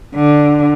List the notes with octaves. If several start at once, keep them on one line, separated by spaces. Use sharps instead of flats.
D3